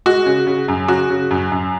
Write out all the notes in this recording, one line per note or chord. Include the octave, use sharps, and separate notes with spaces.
G#3 F#4
C#3
C#3
F#2
C#3 F#4
C#3
F#2
F#2